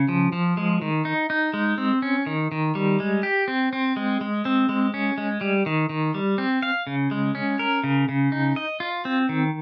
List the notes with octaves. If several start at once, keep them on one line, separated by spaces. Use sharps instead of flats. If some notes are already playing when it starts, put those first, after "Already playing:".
Already playing: C#3
F3
F3
G#3
D#3
D#4
D#4
G#3
C4
C#4
D#3
D#3
G3
G#3
G4
C4
C4
G#3
G#3
C4
G#3
C#4
G#3
G3
D#3
D#3
G3
C4
F5
C#3
G#3
C#4
A#4
C#3
C#3
D#4
D#5
F4
C4
D#3